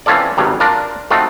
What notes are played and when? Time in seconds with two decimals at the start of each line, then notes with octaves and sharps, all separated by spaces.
0.06 E3 C4 C#4 F4 A4 D5
0.37 G#1 G2 F#3 G3
0.60 D4 F4 A#4
1.11 A3 C4 D#4 F4 F#4